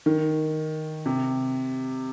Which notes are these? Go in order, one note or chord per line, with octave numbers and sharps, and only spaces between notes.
D#3
C3